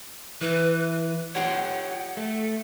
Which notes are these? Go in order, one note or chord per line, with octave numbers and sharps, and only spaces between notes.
E3 B4
F4 G4 C#5 F#5
A3